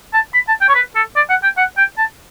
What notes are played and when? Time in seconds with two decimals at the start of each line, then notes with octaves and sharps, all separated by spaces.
0.13 A5
0.34 B5
0.48 A5
0.61 G5
0.69 C#5
0.75 B4
0.95 A4
1.16 D5
1.30 F#5
1.43 G5
1.57 F#5
1.77 G5
1.98 A5